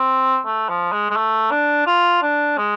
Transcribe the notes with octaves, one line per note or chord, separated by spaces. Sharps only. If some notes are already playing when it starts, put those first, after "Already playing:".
Already playing: C4
A3
F3
G#3
G#3
A3
D4
F4
D4
G#3